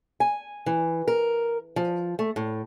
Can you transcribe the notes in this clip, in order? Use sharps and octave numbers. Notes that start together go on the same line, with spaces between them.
G#5
E3
A#4
F3
A3
A2